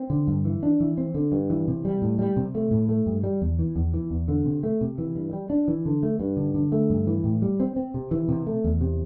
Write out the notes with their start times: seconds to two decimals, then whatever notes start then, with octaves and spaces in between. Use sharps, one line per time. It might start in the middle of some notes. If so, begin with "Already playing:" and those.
Already playing: C4
0.10 D3
0.27 G2
0.45 E3
0.63 D4
0.80 E3
0.97 C4
1.14 D3
1.32 G2
1.50 E3
1.68 C3
1.85 G3
2.02 A2
2.19 G3
2.37 C3
2.55 A3
2.71 A2
2.89 A3
3.06 G2
3.24 G3
3.42 E2
3.59 E3
3.76 E2
3.94 E3
4.11 E2
4.28 D3
4.46 C3
4.63 A3
4.81 C3
4.98 E3
5.16 G2
5.33 G3
5.50 D4
5.68 E3
5.85 D3
6.03 A3
6.20 G2
6.37 D3
6.54 D3
6.72 A3
6.90 G2
7.07 E3
7.24 A2
7.42 G3
7.60 C4
7.76 C4
7.94 C3
8.11 E3
8.29 C3
8.47 A3
8.64 E2
8.81 C3